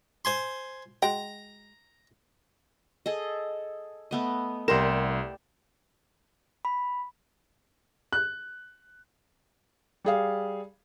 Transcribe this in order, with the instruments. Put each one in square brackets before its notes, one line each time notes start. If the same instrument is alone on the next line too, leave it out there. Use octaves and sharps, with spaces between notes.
[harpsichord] C5 G#5 C6
[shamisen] G#3 F#4 G5 [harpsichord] A#5
[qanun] G#4 A4 D#5
A3 B3 D#5
[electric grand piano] C2 C6 E7 [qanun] G4 D5 [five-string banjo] A#4
[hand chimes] B5
[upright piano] F#6
[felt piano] G3 G#4 F5